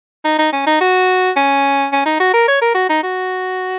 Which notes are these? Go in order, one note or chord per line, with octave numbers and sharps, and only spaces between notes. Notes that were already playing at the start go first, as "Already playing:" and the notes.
D#4
D#4
C#4
D#4
F#4
C#4
C#4
D#4
F#4
A#4
C#5
A#4
F#4
D#4
F#4